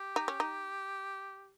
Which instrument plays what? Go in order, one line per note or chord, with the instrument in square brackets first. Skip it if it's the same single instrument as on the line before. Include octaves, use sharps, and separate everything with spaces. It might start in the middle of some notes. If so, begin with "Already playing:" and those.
Already playing: [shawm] G4
[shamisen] D#4
C#4
D#4